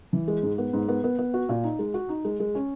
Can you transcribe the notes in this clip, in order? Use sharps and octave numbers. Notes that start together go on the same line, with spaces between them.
E3
G#3
G#2
B3
G#2
B3
B3
B3
F#4
A#2
D#4
G#3
F#4
D#4
G#3
G#3
C#4